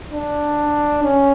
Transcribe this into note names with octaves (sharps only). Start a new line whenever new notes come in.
D4
C#4